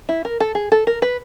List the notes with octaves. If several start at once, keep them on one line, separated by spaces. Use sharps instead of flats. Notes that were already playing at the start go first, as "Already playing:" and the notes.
E4
A#4
A4
G#4
A4
A#4
B4